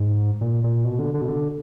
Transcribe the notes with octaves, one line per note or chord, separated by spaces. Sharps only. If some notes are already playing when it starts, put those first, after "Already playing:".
Already playing: G#2
A#2
A#2
B2
D3
D3
B2
D3